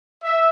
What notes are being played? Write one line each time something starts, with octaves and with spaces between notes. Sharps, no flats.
E5